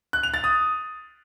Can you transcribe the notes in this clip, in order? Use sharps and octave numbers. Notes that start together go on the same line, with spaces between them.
F#6
F7
A6
D#6